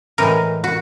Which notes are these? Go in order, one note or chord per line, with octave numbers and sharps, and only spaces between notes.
A2 E3 G#3 A#4
F#4